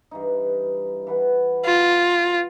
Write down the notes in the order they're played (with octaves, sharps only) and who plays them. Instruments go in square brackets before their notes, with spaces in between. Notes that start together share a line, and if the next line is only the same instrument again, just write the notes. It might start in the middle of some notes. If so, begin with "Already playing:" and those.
[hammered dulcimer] G2 E3 D#4
E3 B4 F#5
[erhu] F4